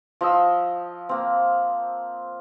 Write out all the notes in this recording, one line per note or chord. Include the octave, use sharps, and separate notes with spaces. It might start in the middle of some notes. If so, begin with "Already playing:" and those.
F3 D#5 E6
A#3 C4